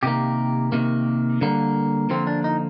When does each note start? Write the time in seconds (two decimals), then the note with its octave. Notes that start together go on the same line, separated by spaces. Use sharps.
0.03 C3 D#3 A#3 G4
0.72 C3 D#3 A#3
1.41 D3 G3 A#3
2.10 D3 F3 A#3 C4
2.27 D4
2.44 D#4